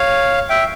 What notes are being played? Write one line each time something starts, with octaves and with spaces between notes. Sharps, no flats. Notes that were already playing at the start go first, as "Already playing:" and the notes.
Already playing: C#5 F5
E5 G5